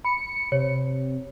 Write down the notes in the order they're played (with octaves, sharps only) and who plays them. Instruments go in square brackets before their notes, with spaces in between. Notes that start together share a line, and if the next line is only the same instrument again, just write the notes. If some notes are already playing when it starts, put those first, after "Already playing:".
[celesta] B5 [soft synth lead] C#7
[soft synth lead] C3 [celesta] C#5